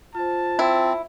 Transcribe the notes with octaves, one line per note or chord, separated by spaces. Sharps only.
F4 C5 A5
C4 E4